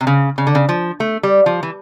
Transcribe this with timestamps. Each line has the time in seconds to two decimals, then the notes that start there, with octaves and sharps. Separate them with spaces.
0.01 C3
0.07 C#3
0.38 C#3
0.47 D3
0.55 C#3
0.69 F3
1.00 A3
1.23 G3
1.46 F3
1.63 E3